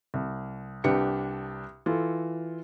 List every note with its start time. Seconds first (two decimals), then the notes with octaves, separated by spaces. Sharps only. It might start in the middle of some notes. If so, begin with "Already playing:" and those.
0.14 C2
0.84 C2 D4 G4 B4 C#7
1.86 E3 F4 A4